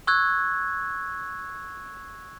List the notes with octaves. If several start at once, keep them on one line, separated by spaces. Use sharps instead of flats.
C#6 E6 F#6 G#6